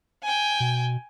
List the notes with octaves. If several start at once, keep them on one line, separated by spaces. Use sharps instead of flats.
G5 G#5
B2